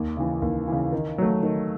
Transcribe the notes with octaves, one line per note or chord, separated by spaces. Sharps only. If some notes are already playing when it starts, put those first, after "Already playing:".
Already playing: D#2
C#3 E3
D#2
C#3 E3
D#3
F#3 A3
D#3